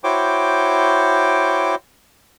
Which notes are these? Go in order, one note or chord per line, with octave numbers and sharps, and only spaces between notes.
E4 F#4 C5 C#5 G5 D6